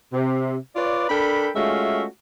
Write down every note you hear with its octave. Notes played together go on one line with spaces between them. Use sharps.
C3
F4 B4 C#5 D5
D4 A4 A#4 G5 B5
G#3 A3 C#4 F4 F#4 E5